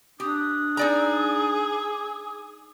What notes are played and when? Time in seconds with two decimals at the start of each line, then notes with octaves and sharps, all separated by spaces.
0.20 D4 G4 D#6
0.77 D#4 G#4 D5 A#5